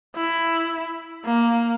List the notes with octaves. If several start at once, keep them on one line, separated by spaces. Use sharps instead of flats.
E4
A#3